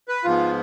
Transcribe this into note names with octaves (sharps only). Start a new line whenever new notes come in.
B4
G#2 F3 B3 F4